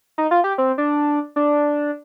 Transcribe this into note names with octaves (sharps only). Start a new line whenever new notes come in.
D#4
F4
G4
C4
D4
D4